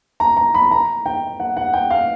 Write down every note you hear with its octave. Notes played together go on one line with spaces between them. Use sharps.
A#5
A#5
B5
A#5
G5
F#5
F#5
G5
F5